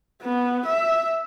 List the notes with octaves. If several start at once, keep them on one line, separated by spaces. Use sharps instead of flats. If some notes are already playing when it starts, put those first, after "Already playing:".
B3
E5